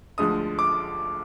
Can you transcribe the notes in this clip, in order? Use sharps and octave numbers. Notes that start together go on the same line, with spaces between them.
D2 D3 F3 G#3 D#6
D6